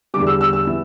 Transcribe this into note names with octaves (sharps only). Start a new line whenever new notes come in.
E2 D3 G3 D6
E6
E6
E6
E3 B3 E4